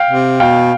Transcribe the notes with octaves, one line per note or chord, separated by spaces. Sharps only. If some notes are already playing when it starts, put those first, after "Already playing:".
Already playing: F5 G5
C3
B2 F5 G5